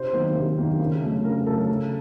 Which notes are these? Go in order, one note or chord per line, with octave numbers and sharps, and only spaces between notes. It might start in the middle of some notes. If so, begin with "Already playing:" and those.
Already playing: C3 C5
D#3 F#3 A#3
C3
D#3 F#3 A#3
C#3
F#3 A3
C#3 A#4
F#3 A3 A4
C#3